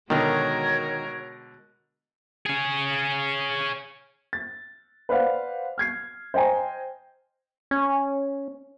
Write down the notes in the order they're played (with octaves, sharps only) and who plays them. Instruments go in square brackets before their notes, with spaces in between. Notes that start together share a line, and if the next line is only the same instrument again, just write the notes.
[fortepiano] B2 D3 [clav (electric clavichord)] D#3 [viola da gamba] G#3 F#4 A#4 [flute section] C#5
[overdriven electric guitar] C#4 G#4
[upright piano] A6
B4 C5 D5 F5 F#5
F6 G#6 C7
C5 D#5 G5 G#5 A#5
[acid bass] C#4